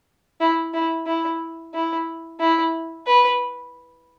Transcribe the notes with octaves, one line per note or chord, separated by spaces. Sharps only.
E4
E4
E4
E4
E4
B4